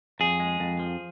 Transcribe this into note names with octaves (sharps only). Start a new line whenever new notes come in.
F2 G#4
G#3
F2
F3